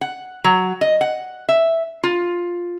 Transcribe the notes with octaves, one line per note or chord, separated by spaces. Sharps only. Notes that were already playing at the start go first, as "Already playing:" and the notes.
F#5
F#3
D#5
F#5
E5
F4